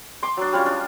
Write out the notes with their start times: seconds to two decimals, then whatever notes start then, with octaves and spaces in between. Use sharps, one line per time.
0.23 C6 D6
0.37 F#3 D4
0.53 G3 C#4 F4
0.66 D4